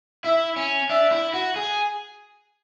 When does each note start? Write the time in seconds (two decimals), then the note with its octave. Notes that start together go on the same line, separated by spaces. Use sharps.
0.24 E4 E5
0.56 C#4
0.89 D4 E5
1.12 E4
1.34 F#4
1.56 G#4